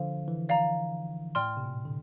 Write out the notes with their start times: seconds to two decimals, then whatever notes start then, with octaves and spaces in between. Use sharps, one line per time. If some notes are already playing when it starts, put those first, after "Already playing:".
Already playing: D3 F3 C5 F5
0.28 E3
0.49 D5 F5 A#5
1.35 A2 D5 G5 C6 F6
1.57 C3
1.64 A#2
1.85 D3